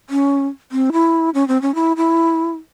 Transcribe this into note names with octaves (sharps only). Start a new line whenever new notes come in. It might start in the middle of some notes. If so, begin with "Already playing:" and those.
C#4
C4
E4
C#4
C4
C#4
E4
E4